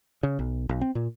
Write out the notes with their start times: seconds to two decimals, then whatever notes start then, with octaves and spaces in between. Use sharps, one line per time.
0.23 C#3
0.39 B1
0.69 B1
0.81 C4
0.95 A#2